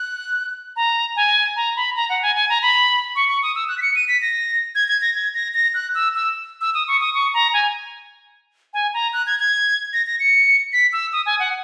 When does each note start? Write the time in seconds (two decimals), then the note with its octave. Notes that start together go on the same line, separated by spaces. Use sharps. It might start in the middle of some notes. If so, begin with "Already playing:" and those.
Already playing: F#6
0.76 A#5
1.16 G#5
1.56 A#5
1.76 B5
1.96 A#5
2.09 F#5
2.22 G#5
2.36 G#5
2.49 A#5
2.62 B5
3.16 C#6
3.29 C#6
3.43 D#6
3.55 E6
3.69 F#6
3.78 B6
3.82 C#7
3.96 D#7
4.08 B6
4.22 A#6
4.75 G#6
4.88 G#6
5.02 A#6
5.15 G#6
5.35 A#6
5.54 A#6
5.74 F#6
5.95 E6
6.15 E6
6.61 E6
6.74 D#6
6.88 C#6
7.01 D#6
7.14 C#6
7.34 A#5
7.53 G#5
8.74 G#5
8.94 A#5
9.13 F#6
9.26 G#6
9.40 G#6
9.93 A#6
10.06 A#6
10.20 C#7
10.73 B6
10.93 E6
11.13 D#6
11.26 G#5
11.39 F#5